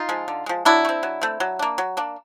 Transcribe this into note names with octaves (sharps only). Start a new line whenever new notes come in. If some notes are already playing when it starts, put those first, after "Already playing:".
Already playing: D#4 F4
F3 G#3
D3
F3 G#3
F#3 D4 E4
A3
C4
F#3
A3 C4
F#3
A#3 D4
F#3
A#3 D4